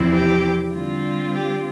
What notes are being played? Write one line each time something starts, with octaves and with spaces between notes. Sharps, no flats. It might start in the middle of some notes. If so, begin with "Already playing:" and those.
Already playing: E2 C3 F3 C4 E4
G4
D3 G3 C4 F4
G4